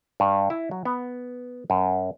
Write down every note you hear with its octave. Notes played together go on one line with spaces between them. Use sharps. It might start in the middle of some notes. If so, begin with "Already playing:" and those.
G2
E4
F#3
B3
F#2